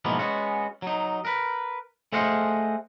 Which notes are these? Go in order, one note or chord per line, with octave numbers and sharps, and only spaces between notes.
G#2 B2 E3 F3 A#3 B3
G#3 B3 C#4 F#4
F#3 D#4
A#4 B4
A3 G#4 C5 D#5 F5 F#5